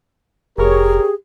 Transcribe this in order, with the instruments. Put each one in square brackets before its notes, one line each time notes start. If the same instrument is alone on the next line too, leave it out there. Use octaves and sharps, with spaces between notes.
[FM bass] F1 [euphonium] G4 [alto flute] G#4 [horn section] A#4 C#5